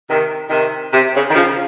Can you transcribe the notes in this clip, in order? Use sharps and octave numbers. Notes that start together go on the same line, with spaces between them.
C3 D#3
C3 D#3
C3
C#3
D#3
C#3 F3